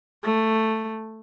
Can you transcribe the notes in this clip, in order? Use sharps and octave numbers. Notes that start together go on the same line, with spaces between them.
A3